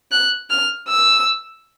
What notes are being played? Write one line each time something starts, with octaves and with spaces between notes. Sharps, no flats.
F#6
F6
E6